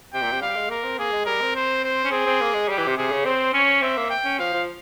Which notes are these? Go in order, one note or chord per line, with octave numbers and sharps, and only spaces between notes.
C3 G5
A#2
C3
G3 F5
G#3
A#3 A#4
C4
A#3 G#4
G#3
G3 A#4
C4
C5
C5
C#4
C4 G#4
C4
A#3
G#3
G3 G4
E3
C3
C3 G#4
C#3
C4 C5
C#4 C#5
C4 E5
A#3
G5
C#4
F3 F5
F3